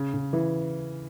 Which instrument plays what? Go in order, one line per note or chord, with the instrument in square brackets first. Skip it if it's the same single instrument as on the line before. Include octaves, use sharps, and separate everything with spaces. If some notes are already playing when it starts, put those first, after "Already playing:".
Already playing: [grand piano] C#3
C#3
E3